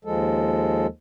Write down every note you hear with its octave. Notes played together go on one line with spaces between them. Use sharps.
D#2 F3 G#3 A4